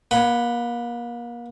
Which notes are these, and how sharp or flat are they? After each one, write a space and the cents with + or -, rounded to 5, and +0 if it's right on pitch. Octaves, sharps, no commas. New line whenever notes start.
A#3 +35 F#5 +0 B5 +0